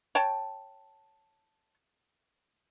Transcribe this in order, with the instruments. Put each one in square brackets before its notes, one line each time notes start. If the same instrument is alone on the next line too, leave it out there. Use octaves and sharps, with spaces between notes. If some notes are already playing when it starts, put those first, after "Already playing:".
[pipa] C#5 G5 A5